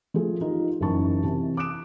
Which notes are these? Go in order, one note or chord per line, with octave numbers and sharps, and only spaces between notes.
F3 A3 G#4
D#4 F4 G4 A#4
F#1 F#2 E3 D#4 A5 C#6
C3 E3 A5
D6 D#6 F#6 D7 E7